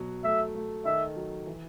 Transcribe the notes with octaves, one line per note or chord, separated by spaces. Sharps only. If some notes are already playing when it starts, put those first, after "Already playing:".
Already playing: B2 F#3
A3 E5
A3
D#3 E5
F#3
E3